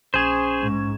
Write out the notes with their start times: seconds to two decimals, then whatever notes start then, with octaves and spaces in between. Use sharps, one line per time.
0.14 A#1 C#4 G#4 C5 C#6 G#6 E7
0.62 G#2